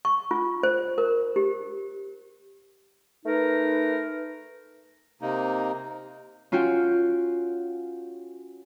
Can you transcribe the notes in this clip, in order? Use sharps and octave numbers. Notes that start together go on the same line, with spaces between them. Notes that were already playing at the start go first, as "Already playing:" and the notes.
C#6
F4
C5
A#4
G4
A3 D#4 A#4 B4
C3 A#3 D#4
C#4 F4 F#4 G5